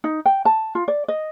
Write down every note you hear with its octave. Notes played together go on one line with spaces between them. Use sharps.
D#4
G5
A5
F4
D5
D#5